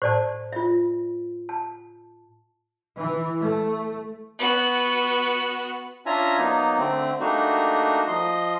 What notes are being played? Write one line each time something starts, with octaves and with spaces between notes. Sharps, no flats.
A2 C5 D5 A5
F4 E5
A5
E3
A3
B3 F#4
C#4 D4 F4 E5 G#5 A#5
F#3 A#3 B3 D#4
D3 A3 C4
G3 A3 A#3 D4 D#4 F#4
F3 D#5 C6